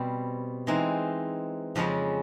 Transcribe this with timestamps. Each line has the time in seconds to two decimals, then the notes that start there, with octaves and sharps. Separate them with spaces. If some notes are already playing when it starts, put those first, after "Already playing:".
Already playing: B2 G3 C4
0.67 E3 G#3 C4 D#4
1.76 F2 C#3 F3 G#3 C#4